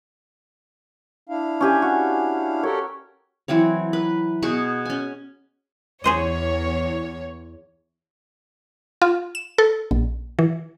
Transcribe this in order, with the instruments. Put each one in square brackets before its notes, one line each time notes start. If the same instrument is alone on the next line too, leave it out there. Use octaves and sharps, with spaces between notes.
[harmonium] D4 E4 F5
[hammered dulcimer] C#4 G4 G#5
F#4
[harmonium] G4 A4 A#4 [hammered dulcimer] C#5
[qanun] E3 F#3 C4 C#5
B4
B2 F#4 G#4 C#6
C#4 G#5
[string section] E2 C#5 [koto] G#4 C5 D#5
[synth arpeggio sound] F4
E7
A4
A#1
E3